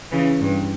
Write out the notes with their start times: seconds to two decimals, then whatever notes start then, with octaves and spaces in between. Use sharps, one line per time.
0.11 C#3 E3
0.41 G2